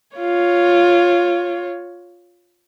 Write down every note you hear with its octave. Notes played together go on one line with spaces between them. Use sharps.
F4 C#5